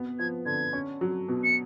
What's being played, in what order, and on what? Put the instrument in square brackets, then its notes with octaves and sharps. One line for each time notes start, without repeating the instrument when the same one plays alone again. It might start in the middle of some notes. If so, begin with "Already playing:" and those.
Already playing: [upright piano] B2 B3
[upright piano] F3 [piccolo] G#6
[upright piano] D3 [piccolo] G#6
[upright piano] C#4
F#3
B2
[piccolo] C#7